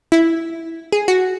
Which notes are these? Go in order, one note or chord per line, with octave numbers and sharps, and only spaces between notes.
E4
G#4
F#4